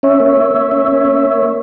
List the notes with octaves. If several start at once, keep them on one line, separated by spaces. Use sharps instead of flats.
C#4 C#5 E5
A#3
A#3
A#3
C#4
C#4
A#3